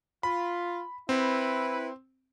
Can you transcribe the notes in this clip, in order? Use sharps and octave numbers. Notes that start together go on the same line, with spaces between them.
F4 B5
C4 E4 B4